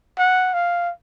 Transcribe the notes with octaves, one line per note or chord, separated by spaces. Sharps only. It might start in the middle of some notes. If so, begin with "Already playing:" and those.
F#5
F5